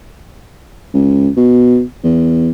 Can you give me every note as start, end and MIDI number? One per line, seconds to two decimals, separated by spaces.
0.94 1.29 37
1.37 1.82 47
2.04 2.51 40